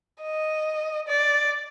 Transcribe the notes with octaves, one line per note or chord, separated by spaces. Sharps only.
D#5
D5